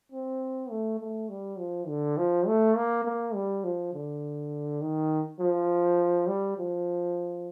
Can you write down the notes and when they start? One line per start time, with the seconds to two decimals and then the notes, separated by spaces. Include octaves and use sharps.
0.12 C4
0.70 A3
1.00 A3
1.29 G3
1.58 F3
1.88 D3
2.17 F3
2.47 A3
2.76 A#3
3.05 A#3
3.34 G3
3.64 F3
3.93 D3
4.81 D#3
5.40 F3
6.27 G3
6.57 F3